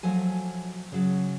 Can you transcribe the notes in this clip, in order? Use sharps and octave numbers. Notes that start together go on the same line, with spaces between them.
F3 F#3 A3 G#5
C#3 F#3